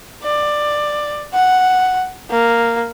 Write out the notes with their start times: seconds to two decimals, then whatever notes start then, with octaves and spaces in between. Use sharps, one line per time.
0.23 D5
1.33 F#5
2.30 A#3